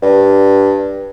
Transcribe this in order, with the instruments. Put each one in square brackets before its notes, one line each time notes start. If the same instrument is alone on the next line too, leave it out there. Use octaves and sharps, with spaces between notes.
[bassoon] G2